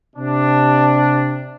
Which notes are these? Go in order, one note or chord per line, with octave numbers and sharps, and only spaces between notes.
C3 D4